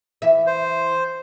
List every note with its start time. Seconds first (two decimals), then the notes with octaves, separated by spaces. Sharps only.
0.22 E3 E5
0.46 C5